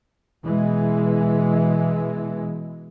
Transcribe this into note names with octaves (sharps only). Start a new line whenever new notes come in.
B2 E3 G#3